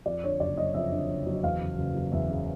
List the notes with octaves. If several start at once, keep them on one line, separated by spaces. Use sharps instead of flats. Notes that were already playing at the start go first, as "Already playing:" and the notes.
F2 D5
D3 C#5
F#1 D5
F#3 D#5
F2 E5
D3
F#1
F#3
E2 F5
C#3
F#1
F#3
E2 E5
C#3